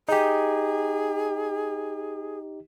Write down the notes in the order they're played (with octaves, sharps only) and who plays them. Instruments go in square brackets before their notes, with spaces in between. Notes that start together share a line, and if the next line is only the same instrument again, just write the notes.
[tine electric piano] D#4 G4 [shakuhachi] G#4